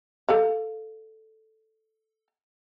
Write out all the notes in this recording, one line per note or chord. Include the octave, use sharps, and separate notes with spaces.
A4 D5 F5